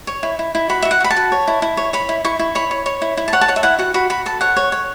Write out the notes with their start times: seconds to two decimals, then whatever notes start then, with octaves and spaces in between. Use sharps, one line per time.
0.07 C#5
0.23 E4
0.39 E4
0.55 E4
0.69 F#4 B5
0.82 E5
0.85 F#4
0.91 F#5
1.01 F#4 B5
1.11 A5
1.16 F#4
1.32 C#5
1.48 E4
1.62 E4
1.77 C#5
1.93 C#5 B5
2.09 E4
2.24 E4 C#6
2.39 E4
2.55 C#5 B5
2.71 C#5
2.86 C#5
3.02 E4
3.17 E4
3.28 A5
3.33 C#5 F#5
3.41 A5
3.48 C#5 F#5
3.56 E5
3.63 E4 F#5
3.79 F#4 F#5
3.94 F#4 B5
4.10 F#4 B5
4.26 A4 A5
4.41 C#5 F#5
4.56 C#5
4.72 C#5